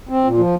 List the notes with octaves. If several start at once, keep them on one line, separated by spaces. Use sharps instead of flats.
C4
A#2
F3